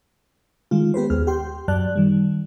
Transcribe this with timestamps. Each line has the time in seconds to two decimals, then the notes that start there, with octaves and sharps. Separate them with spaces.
0.71 D#3 G#3 F4
0.94 B3 G4 B4 C5
1.10 D#2 G#4 F6
1.27 G4 G5 C6
1.68 F#2 F#3 D5 A5 F#6
1.96 D#3 G3